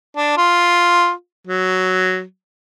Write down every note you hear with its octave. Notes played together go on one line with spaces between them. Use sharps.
D4
F4
F#3